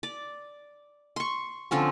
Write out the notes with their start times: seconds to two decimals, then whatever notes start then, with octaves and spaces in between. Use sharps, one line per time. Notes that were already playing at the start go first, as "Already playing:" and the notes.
0.03 D5
1.16 C6 C#6
1.71 D3 F3 C4 C#4